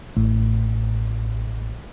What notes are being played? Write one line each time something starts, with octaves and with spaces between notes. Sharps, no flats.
A1 A2